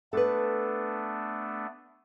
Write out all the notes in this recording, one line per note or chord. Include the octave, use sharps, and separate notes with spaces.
A3 B3 D4 A4 B4